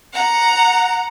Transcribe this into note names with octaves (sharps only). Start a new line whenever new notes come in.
F#5 A#5